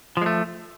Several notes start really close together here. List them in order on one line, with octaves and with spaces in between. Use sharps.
F3 G#3 A3